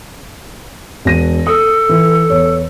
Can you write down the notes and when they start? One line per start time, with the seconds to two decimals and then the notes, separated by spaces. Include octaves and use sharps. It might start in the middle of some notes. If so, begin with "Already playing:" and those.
1.05 E1 A#6 D#7
1.47 A4 D#6
1.89 E3
2.30 E2 C#5